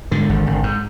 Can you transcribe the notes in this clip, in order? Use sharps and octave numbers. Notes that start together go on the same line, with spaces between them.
G#2 D3
G#1
G#1
G#2